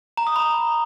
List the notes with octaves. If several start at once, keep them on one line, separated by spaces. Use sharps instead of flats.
A#5
D#6
B5